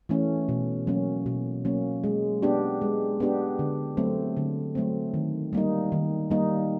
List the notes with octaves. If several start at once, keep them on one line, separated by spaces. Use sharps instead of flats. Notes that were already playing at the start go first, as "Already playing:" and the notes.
E3 A3 C#4
B2
F#3 A#3 C#4
B2
F#3 A#3 C#4
G#3
B3 D4 G4
G#3
B3 D4 G4
D3
F#3 A3 C4
D3
F#3 A3 C4
D#3
G3 A#3 D#4
D#3
G3 A#3 D#4